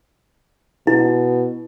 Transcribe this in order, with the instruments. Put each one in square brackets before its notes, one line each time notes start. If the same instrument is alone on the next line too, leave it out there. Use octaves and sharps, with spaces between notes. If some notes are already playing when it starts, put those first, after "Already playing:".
[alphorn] B2 [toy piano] E4